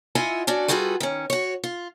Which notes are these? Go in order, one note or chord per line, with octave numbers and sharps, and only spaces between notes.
E4 F4 D#5 E5 F#5 G#5
C#4 D4 F#4 D5
G3 F4 F#4 G#4 A4 B4
D#3 C#4
F#4 C#5
F4